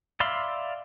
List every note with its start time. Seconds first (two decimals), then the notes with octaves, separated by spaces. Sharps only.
0.20 D5 E5 F5 B5 C6